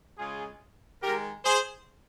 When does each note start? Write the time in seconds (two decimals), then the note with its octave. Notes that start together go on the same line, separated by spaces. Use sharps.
0.17 C#3 G#3 F4 G#4
1.02 D#3 G#3 G4 A#4
1.45 G#4 C5